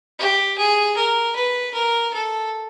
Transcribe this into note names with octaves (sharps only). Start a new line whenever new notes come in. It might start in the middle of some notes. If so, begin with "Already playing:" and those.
G4
G#4
A#4
B4
A#4
A4